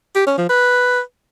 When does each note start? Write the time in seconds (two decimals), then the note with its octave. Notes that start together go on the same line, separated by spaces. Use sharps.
0.15 G4
0.27 C#4
0.38 F3
0.49 B4